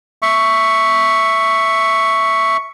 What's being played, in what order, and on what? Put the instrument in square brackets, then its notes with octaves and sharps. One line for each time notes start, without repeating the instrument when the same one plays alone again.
[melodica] E5 C#6